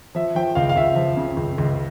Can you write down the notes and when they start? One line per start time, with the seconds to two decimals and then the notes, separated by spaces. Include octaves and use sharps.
0.15 F3 E5
0.35 F3 G5
0.55 C#2 F5
0.69 F5
0.76 C#2 E5
0.96 F3
1.17 C#3
1.37 C#2
1.58 C#2